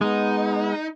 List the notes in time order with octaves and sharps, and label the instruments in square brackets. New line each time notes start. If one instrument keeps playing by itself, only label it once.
[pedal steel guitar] G#3 [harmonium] B3 [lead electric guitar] D#4